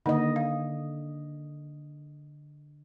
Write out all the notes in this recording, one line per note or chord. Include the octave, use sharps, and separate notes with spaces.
D3 D#3 A#3 D#4 D#5
F5